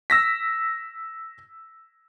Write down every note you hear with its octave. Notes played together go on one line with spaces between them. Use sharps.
E6 A#6 B6